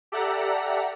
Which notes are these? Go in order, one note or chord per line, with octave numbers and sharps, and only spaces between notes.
G4 A4 D5 E5 F#5 A#5